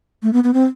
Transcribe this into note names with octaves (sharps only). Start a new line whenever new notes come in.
A3
B3
B3
C4